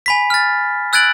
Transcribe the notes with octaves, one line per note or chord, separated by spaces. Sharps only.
G#5 B5 B6
F6 A6
E6 F#6 G#6 A6 D7 F#7